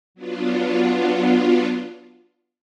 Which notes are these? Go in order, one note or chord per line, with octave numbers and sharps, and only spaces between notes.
F#3 B3 D4 F4